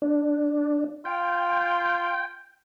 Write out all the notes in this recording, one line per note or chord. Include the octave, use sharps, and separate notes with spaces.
D4
F4 G5